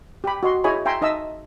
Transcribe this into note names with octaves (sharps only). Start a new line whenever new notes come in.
G4 B5
F#4 D#5 C6
E4 G#4 C#5 D#5 G#5 B5
E5 G5 G#5 A#5 C6
D#4 D#5 E5 A5 E6